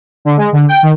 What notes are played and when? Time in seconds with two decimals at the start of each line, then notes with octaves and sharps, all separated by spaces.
0.25 D3
0.37 G#3
0.53 D3
0.68 G5
0.83 D#3